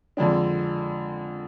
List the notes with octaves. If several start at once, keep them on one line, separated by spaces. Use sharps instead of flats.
F2 D3 F3 G#3 D4